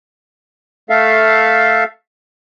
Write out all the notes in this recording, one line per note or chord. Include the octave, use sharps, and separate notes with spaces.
A3 A4 E5 F5